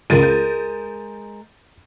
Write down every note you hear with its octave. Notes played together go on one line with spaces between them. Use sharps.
C#2 G#3 A#4 A6 D#7
G6